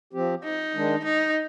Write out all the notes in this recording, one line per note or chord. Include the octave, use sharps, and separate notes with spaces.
F3 C4 G4
D#4
D#3 G#3 D4
D#4